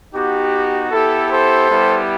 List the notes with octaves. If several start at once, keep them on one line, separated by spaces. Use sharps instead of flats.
B3 D#4 F#4 G4
B3 E4 G4 A4
A4 C5
G3 B3 E4 G4